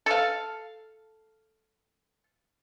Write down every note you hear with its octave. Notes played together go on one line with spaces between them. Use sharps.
A4 F5